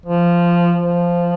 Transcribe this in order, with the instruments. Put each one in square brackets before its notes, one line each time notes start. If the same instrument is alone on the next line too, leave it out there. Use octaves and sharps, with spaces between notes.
[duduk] F3
F3